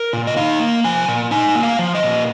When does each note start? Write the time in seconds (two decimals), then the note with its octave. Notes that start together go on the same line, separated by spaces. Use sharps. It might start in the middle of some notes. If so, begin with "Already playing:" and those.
Already playing: A#4
0.13 A#2
0.27 D#5
0.36 D#4 F5
0.60 A#3
0.84 F3 G#5
1.08 A#2
1.31 D#4 G#5
1.55 A#3
1.63 F5
1.79 F3
1.95 D#5
2.03 A#2